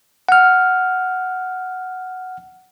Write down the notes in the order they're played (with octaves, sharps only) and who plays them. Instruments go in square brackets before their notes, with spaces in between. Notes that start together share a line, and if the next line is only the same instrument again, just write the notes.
[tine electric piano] F#5 F6